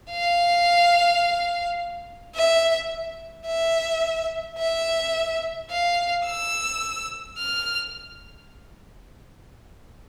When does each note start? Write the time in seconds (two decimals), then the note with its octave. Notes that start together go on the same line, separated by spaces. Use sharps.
0.10 F5
2.35 E5
3.46 E5
4.58 E5
5.71 F5
6.26 E6
7.38 F6